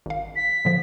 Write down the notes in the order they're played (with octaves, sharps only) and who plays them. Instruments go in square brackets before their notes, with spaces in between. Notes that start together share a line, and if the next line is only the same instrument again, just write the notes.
[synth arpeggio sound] G#1 F5
[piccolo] B6
[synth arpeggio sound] A2 D3 F3